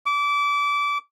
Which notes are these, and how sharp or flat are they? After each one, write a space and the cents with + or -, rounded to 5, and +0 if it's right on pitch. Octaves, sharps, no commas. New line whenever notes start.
D6 -25